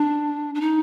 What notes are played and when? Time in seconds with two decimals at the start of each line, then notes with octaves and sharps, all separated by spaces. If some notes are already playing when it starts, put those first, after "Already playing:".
Already playing: D4
0.55 D4
0.61 D#4